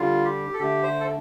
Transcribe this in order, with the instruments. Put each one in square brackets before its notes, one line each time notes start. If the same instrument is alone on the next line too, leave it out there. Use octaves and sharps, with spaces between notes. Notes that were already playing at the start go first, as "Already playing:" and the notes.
Already playing: [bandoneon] D3 G3 F4
G4
A4
D3 A3 G4
C5
A4